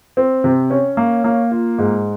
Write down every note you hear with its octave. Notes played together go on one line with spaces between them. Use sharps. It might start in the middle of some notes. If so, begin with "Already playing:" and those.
C4
C3
C#4
A#3
A#3
F4
G#2